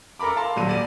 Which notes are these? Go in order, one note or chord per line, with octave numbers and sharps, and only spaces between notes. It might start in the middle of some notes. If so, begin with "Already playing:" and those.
A4 A#4 A#5 B5 D6
F5 A5 C6
D#1 F#3 G3 D#7
D5 D#7